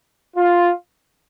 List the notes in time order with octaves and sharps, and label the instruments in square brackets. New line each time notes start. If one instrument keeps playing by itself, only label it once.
[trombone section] F4